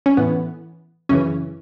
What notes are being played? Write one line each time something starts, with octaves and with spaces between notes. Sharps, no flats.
C#4
A2 E3 B3
F#2 C#3 E3 C#4